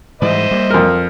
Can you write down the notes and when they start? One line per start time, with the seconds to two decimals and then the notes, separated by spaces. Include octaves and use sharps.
0.22 G#2 E3 G3 C5 D#5 E5
0.51 G3 A#3
0.70 F2 A#4